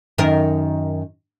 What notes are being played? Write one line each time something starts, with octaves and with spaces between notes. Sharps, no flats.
F#2 D#3 A#4